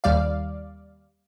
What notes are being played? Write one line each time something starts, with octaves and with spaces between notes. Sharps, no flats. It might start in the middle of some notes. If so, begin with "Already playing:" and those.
D#2 G3 D5 F5